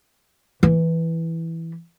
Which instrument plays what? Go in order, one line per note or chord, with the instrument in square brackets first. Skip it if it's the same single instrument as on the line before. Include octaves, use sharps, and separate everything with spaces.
[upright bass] E3 E4